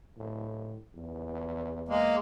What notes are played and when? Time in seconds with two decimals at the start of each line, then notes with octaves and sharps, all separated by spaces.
0.17 A2
0.95 E2
1.89 G#3 A#3